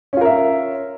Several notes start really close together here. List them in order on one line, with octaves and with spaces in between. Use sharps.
C#4 F4 A#4 E5